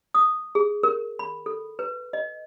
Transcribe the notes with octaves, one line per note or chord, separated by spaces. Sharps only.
D#6
G#4
A#4
B5
A4
B4
D#5